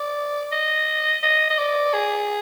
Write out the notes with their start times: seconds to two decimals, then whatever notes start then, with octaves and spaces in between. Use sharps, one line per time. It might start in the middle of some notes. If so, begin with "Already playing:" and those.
Already playing: D5
0.52 D#5
1.23 D#5
1.50 D#5
1.58 D5
1.94 G#4